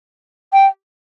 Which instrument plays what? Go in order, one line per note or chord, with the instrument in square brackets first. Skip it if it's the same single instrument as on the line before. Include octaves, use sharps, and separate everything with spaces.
[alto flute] G5